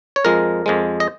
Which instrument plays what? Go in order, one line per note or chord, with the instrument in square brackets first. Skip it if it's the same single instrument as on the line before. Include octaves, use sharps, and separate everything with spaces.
[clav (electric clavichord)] C#5
F2 F3 G#3 A#4
F2 F3 G#3
D#5